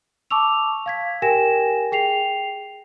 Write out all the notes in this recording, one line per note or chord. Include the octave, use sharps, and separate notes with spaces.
A5 C#6 D6 E6 F7
F5 G#6 B6
G4 A#4 G5 G#5 A#6 E7
G#4 G5 C7 F7